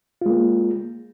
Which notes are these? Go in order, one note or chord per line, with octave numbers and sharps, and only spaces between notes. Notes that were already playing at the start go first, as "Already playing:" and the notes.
G#3 A#3 F4